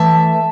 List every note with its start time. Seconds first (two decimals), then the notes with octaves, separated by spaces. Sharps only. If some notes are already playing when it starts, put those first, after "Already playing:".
Already playing: E3 A3 E5 A5